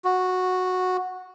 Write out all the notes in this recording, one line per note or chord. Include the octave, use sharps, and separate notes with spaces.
F#4